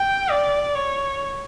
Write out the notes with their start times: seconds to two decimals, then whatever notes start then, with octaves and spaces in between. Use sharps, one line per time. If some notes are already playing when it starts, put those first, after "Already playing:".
Already playing: G5
0.30 D5
0.75 C#5